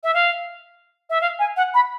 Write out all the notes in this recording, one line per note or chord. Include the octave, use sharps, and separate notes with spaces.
E5
F5
E5
F5
G#5
F#5
B5